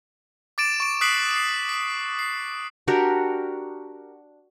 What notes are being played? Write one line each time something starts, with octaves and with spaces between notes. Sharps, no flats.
D6 A6 D7 E7
C#6 D7
D#6 F#6 B6 C7 D7 F#7
C7 D7
B6
C7
D4 F#4 G4 A#4